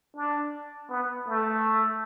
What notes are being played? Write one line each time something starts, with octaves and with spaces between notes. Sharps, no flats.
D4
B3
A3